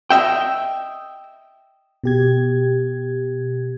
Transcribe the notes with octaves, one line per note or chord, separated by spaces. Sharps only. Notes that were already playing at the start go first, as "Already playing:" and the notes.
D#5 E5 G5
B2 G4 G#6